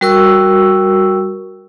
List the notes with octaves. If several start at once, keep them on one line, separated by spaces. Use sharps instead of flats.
G3 F#4 A#4 C#6 E6